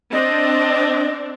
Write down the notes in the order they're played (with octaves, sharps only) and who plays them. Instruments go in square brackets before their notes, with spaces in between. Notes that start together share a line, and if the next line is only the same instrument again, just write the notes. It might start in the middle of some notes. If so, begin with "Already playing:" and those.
[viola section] C4 D4 [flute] D#5